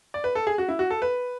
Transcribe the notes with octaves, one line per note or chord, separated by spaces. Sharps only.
D5
B4
A4
G#4
F#4
E4
F#4
A4
B4